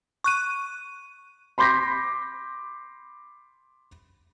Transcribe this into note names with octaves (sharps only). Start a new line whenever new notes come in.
C#6 F#6 D#7
B5 C6 D6 G6 A#6 B6